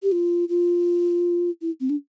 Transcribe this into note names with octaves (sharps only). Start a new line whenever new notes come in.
G4
F4
F4
E4
C4
D4